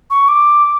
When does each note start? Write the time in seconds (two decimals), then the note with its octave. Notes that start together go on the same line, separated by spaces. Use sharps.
0.10 C#6
0.28 D6